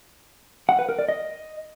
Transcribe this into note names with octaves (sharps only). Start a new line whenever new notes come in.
F#5
B4
A#4
D5
D#5